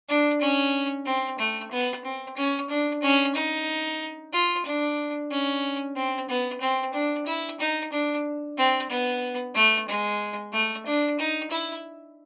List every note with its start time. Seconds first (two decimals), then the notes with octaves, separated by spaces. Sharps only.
0.08 D4
0.41 C#4
1.06 C4
1.39 A3
1.71 B3
2.04 C4
2.36 C#4
2.69 D4
3.02 C#4
3.35 D#4
4.33 F4
4.66 D4
5.31 C#4
5.95 C4
6.29 B3
6.61 C4
6.93 D4
7.26 E4
7.60 D#4
7.92 D4
8.58 C4
8.90 B3
9.55 A3
9.88 G#3
10.53 A3
10.86 D4
11.19 D#4
11.51 E4